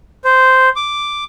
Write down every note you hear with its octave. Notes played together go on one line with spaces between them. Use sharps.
C5
D6